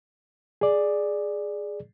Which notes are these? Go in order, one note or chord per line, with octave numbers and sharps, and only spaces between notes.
G#4 D5